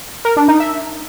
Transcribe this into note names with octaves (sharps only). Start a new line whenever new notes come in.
A#4
D4
D#4
E5